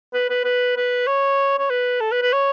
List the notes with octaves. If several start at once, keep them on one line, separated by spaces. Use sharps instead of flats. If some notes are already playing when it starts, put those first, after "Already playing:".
B4
B4
B4
B4
C#5
C#5
B4
A4
B4
B4
C#5